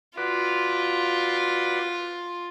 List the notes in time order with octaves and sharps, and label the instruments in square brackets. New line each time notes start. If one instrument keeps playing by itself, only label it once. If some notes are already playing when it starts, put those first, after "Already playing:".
[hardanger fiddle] F4 [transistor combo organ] F#4 B4 D5